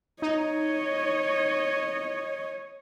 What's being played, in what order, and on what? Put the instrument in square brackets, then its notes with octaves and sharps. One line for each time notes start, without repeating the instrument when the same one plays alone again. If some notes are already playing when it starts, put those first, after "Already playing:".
[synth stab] D#4 [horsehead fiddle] C#5 D#5